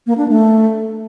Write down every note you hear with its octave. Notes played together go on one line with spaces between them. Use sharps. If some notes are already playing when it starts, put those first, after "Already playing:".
A#3
D4
A3